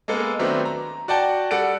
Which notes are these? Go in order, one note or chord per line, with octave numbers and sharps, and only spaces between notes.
G#3 A#3 B3 A4
D#3 F#3 A3 B3 C4 D4
A#5
F#4 D5 F#5 G5 A5
G3 A4 D5 F#5 F#6 D7